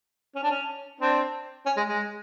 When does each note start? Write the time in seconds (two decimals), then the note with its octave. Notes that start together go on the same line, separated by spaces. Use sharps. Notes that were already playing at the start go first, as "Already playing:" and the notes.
0.35 C#4
0.43 D4
0.50 C#4
1.00 C4 D4
1.66 C#4
1.77 G#3
1.88 G#3